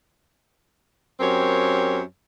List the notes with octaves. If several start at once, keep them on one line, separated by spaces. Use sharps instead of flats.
F#2 C4 G4 A#4 C#5